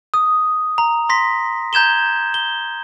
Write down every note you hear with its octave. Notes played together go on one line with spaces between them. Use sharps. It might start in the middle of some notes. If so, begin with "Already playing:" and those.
D#6
A#5
C6 A#6 B6
A#5 G6 G#6 E7 G7
G7